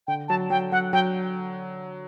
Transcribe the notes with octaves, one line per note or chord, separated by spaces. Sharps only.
D3 G5
F#3 A5
F#3 G5
F#3 F#5
F#3 G5